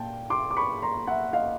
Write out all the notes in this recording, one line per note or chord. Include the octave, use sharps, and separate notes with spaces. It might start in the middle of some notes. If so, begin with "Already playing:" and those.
Already playing: A#2 G5 A5
C6 D6
D6
B5 C#6
A#5 C6
E5 F#5
D#5 F5